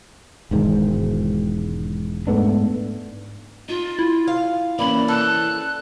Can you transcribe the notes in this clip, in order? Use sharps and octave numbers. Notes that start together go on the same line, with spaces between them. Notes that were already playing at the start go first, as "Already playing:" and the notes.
E1 G#2 D#3
G#2 A3 B3 D4
D#4 F4
E4
F5
E3 A#3 C#4 D4 B5
A4 F#6